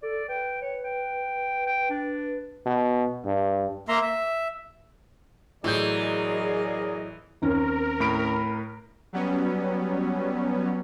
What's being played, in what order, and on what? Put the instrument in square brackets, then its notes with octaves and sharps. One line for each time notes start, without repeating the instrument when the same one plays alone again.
[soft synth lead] A4 [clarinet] D5
[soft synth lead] B4 [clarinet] G5
[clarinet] C#5
G5
G5
D4
[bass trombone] B2
G2
[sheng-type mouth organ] A#3 E5 A#5 C6
E5
[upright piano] A2 G6 [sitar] E3 [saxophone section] F#3 G#4 [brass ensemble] A#4 D5 D#5
[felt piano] D#2 C4 C#4 [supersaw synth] A#4
[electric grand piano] A2 B5 D7
[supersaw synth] F#3 G3 B3 C#4